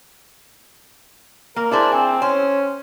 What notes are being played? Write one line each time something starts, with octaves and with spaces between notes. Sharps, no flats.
A#3 A#4
D4 E4 G#4 C5
C4 G#5
C#4 C5